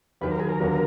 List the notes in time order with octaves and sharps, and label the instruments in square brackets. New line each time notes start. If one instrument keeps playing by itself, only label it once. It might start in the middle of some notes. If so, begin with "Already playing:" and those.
[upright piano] D#2 D#3 F#3 [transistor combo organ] B4
[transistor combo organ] A#4
G#4
A#4
[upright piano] D#2 D3 F#3 B3